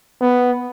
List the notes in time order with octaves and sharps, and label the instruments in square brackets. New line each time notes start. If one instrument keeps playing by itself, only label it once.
[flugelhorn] B3